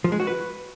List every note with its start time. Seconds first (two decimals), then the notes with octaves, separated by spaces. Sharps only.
0.04 F3
0.12 G#3
0.20 F#4
0.27 B4